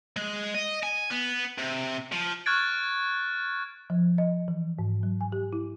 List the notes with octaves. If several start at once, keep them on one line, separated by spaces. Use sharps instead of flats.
G#3
D#5
G#5
B3
C3
F3
C#6 F6 F#6 G#6 A6 D7
F3
D#5
E3
G#2
F#3
G#5
G4
E4